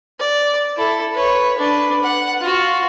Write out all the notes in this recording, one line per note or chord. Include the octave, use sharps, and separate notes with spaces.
D5
E4 A4
B4 C#5
D4 B4
F#5
F4 F#4